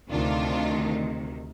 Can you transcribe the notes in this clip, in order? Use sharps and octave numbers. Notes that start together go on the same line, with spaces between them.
D2 C3 D#3 D4 F4